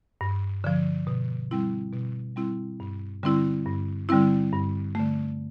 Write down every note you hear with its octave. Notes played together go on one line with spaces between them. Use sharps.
G2
D3 F3
B2
G3 C4 E4
B2
G3 C4 E4
G2
D3 G3 C4 E4
G2
D3 G3 C4 E4
G2
D3 A3